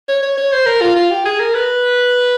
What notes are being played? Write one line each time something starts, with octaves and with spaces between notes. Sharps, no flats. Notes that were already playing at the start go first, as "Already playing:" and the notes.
C#5
C#5
C#5
C5
A#4
F4
F4
G4
G#4
A#4
B4